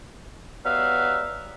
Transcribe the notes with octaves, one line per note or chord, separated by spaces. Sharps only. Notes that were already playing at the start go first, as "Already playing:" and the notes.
F#3 G3 B3 B4 E5 F5